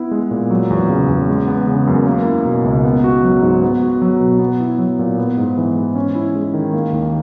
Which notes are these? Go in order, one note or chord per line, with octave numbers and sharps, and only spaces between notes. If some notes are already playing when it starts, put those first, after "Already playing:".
Already playing: B3 E4
G#3
A#2
F#3
E2
C#3
E2
G#3
B3
C#3
F#2
A#3
E4
B2
C#2
B3
F#4
F#3
G#2
B3
F#4
F#3
B2
B3
E4
F#3
A#2
B3
G#2
E3
G#2
C#4
E4
G#3
D#3
A#3
D#2